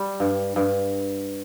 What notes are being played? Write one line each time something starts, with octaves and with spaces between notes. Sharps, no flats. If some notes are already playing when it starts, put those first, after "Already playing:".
Already playing: G3
G2
G2